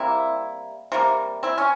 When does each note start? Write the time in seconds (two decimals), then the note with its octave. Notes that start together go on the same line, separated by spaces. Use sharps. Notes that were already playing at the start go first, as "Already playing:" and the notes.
Already playing: C3 G3 A#3 C4 E4
0.92 C3 G3 A#3
1.43 C4 E4
1.58 C#4